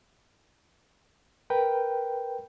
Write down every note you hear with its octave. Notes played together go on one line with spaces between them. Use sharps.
A#4 B4 G5